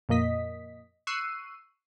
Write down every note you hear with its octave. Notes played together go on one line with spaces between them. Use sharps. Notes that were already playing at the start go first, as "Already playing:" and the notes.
F2 A#2 A#3 D#5 B6
C#6 E6 F#6 C7 D#7